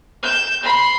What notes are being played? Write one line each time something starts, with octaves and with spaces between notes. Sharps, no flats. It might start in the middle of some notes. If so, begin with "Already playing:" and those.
G6 E7
B5 C6